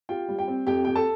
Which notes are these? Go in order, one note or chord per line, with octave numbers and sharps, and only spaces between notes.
F4 G4 G5
G3
G4 G5
C4
F2 G4 G5
F2 G5
A4 A5